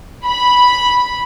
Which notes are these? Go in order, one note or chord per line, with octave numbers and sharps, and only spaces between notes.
B5